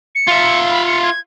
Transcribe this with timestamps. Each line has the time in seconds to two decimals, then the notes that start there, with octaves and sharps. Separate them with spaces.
0.15 C#7
0.27 F4 E5
0.71 B5
0.87 C#7
1.03 G#6